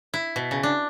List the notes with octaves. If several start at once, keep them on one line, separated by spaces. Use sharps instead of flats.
E4
B2
C#3
D4